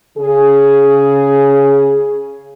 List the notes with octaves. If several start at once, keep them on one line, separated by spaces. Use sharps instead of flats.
C#3 G#4